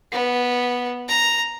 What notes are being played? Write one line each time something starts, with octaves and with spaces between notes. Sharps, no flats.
B3
A#5